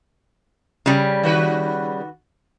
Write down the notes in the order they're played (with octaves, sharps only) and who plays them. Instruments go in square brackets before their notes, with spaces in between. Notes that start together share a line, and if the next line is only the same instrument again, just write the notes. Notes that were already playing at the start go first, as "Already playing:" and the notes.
[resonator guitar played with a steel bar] C#3 G3
[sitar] D#3 F#4 B4